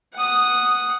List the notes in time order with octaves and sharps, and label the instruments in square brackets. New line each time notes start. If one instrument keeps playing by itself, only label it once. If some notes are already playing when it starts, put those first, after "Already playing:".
[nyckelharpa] F#5 D#6